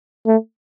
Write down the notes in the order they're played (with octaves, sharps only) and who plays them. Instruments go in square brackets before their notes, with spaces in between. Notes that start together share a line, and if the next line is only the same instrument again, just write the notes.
[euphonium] A3